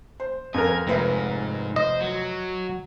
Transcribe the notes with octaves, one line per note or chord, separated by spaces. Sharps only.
C5
F2 A#4 G#5
F1 G#2 B4 E5
C5 D#5
F#3